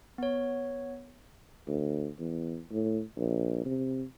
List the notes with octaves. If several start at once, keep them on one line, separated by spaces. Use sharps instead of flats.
B3 C#5
D2
E2
A2
A#1
C3